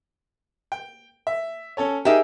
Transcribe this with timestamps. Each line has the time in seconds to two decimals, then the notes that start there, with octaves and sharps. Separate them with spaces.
0.72 G5
1.27 E5
1.77 C#4 A4 C#5
2.05 D#4 G4 G#4 A#4 E5